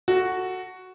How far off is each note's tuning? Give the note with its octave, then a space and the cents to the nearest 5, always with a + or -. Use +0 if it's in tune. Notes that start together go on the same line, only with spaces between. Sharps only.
F#4 +0 A4 +20